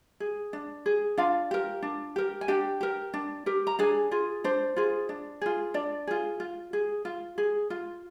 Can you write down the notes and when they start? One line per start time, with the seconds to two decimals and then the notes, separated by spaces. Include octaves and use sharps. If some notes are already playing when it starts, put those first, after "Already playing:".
0.20 G#4
0.53 D4
0.86 G#4
1.18 D4 F4 F5
1.51 G4 A#4
1.82 D4
2.16 G4 A#4
2.41 G#5
2.48 D4 G4 G5
2.81 G4 A#4
3.14 D4
3.46 G4 A#4
3.67 A#5
3.79 D4 G#4 G#5
4.11 F4 G#4
4.44 D4 C5
4.76 F4 G#4
5.09 D4
5.41 F4 G#4
5.74 D4 D5
6.07 F4 G#4
6.40 F4
6.73 G#4
7.05 F4
7.38 G#4
7.70 F4